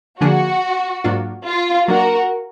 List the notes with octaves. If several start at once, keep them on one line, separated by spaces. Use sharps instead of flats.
D3 F3 A#3 D4 F#4 G#4
G#2 F#3 A#3 D4 F4
F4
F#3 A#3 D4 F#4 A#4